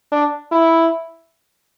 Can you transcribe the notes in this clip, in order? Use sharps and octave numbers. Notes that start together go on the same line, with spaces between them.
D4
E4